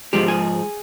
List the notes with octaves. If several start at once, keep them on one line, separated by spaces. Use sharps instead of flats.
G#2 F3 G#3 G4
G#4